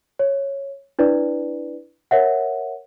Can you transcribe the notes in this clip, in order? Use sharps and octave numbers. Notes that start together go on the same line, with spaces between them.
C#5
D4 E4 B4 D5
A#4 C#5 E5 F#5